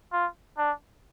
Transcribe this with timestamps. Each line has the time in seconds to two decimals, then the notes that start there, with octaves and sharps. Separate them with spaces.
0.13 F4
0.58 D4